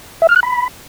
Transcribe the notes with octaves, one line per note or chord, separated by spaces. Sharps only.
E5
F6
F#6
B5